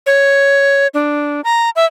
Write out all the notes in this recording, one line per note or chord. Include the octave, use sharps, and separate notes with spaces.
C#5
D4
A#5
E5